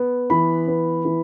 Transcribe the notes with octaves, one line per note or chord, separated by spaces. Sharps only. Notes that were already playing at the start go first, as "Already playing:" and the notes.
Already playing: B3
E3 B5
B3
E3